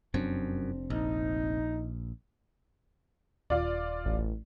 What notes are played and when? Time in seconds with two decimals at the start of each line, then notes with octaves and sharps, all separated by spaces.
0.14 F1 F#2 C4 D4
0.90 A#1 D#4
3.50 D#1 F4 D5
4.05 A1